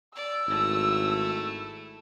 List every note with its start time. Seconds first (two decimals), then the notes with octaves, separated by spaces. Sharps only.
0.16 D5 E6
0.48 G#1 A3 E4